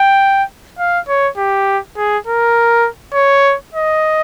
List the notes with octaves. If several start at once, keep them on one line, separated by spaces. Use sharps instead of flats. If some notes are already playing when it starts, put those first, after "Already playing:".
Already playing: G5
F5
C#5
G4
G#4
A#4
C#5
D#5